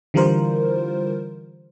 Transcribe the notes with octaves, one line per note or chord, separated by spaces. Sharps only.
D3 E3 G3 F4 A#4 C5